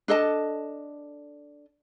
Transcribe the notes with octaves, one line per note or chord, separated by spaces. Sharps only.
D4 A4 D#5 A5